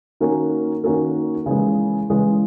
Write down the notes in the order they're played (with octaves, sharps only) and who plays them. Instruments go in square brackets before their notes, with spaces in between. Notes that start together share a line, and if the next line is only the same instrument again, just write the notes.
[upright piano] D#3 A#3 C#4 F#4 A#4
D#3 A#3 C#4 F#4 A#4
C#3 E3 G#3
C#3 E3 G#3